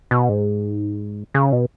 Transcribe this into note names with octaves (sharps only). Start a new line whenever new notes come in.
B2
G#2
C#3
B2